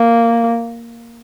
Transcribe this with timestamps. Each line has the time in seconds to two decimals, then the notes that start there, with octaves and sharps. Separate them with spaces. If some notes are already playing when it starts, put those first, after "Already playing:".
Already playing: A#3